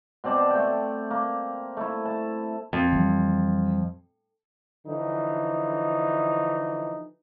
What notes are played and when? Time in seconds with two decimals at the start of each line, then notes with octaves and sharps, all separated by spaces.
0.24 B2 C4 D5 A5
0.50 A3 G5
1.11 A#3
1.77 A3 E4
2.05 A5
2.73 F2
2.93 E3 G3
4.87 D3 E3 F3 D#4